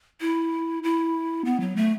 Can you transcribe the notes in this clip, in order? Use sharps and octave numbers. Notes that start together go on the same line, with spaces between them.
E4
E4
B3
F#3
A3